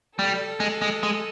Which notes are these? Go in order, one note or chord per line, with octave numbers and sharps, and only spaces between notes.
G3 A4
G#3
G#3
G#3